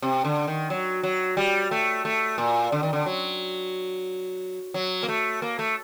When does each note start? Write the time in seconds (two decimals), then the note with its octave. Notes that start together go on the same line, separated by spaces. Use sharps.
0.02 C3
0.25 D3
0.47 D#3
0.70 F#3
1.03 F#3
1.37 G3
1.71 A3
2.05 A3
2.38 A#2
2.72 D3
2.83 D#3
2.93 D3
3.06 F#3
4.74 F#3
5.03 A#3
5.08 A3
5.42 A#3
5.59 A3